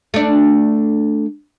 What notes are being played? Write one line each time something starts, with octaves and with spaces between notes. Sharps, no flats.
A3 D4